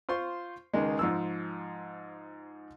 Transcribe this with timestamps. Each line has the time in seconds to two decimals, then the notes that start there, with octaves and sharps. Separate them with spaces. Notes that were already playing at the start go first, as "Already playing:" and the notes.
0.09 F4 C5 C6 C#6
0.74 C#2 D#3 G#3
0.99 G#2 F3 E6